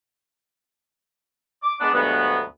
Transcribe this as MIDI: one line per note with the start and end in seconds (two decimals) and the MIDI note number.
1.63 1.75 86
1.80 1.89 56
1.80 1.89 59
1.80 1.89 62
1.94 2.41 38
1.94 2.41 43
1.94 2.41 47
1.94 2.41 54
1.94 2.41 56
1.94 2.41 59